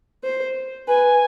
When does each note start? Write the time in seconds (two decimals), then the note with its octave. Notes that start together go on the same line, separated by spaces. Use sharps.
0.24 C5
0.87 B4 G#5